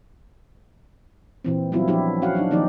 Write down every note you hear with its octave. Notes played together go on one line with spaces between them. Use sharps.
A#2 E3 C4
F#3 G3 B3 C4 E4 F4
F3 B3 D4 E4 G4
C#4 F#4 F5 F#5
F#3 D4 D#4
D#3 F3 A#3 D#4 G4 D5